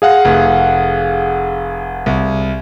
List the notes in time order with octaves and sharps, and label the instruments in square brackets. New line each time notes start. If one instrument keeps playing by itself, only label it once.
[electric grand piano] G#4 F5 F#5
[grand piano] F1
C2